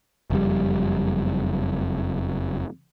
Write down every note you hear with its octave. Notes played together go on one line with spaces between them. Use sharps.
F#1 F2 G3